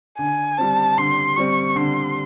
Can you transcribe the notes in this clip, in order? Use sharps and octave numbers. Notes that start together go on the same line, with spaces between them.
D3 G#5
G3 C4 A5
D3 C6
G3 C4 C#6
D3 C6